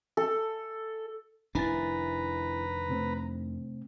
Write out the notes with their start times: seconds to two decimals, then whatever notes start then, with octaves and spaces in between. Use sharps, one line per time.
0.17 A4
1.55 F1 D#3 D4 E4 B4 G#5 A#5 A6
2.89 C3 A3 C4